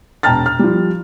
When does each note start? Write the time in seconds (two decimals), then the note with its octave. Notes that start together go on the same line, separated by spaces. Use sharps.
0.23 E1 G5 A5 A#5 F6 A6
0.46 F6
0.59 F3 G3